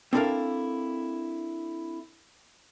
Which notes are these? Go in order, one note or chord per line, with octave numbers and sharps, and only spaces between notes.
C4 D4 E4 A4 A#4 F5